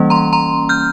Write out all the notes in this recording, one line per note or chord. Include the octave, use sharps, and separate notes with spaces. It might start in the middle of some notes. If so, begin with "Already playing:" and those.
Already playing: E3 G3 A#3 C#4
A#5 C6
A#5 C6
F6 G6